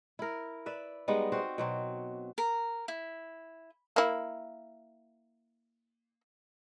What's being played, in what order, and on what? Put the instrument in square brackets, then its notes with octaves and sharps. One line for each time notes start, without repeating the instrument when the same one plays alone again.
[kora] E4 A#4
B4 D5 E5
G3 G#3 B3 D#4
C4 F#4 C5
B2 F#3 C4
[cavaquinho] A#4
E4
[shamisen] A#3 E4